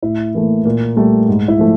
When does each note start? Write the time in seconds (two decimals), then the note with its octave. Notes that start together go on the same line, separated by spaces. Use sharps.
0.03 A2 E4
0.35 E3 A3 A#3
0.65 A#2 A#3
0.97 G3 A3
1.28 G#2
1.48 E4
1.59 F3 A3